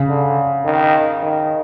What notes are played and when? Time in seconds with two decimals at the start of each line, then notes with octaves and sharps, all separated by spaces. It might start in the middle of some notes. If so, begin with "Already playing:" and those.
Already playing: C#3
0.09 D3
0.65 D#3
1.22 D#3